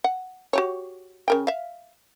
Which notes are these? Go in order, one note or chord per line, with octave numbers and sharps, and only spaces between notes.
F#5
F#4 G4 C#5
C#3 A#4 G5
E5 F5